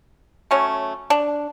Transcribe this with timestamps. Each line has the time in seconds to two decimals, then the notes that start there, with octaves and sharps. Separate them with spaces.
0.51 F#3 A3 C#4
1.10 D4